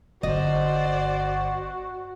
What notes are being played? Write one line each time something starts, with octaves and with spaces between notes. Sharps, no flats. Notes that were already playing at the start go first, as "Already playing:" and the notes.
G1 F#4 C5 D5 D#5